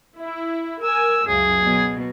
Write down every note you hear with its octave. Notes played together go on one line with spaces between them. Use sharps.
E4
A#4 G#5 E6
C#2 F#2 C#3 G#4
B2 F#3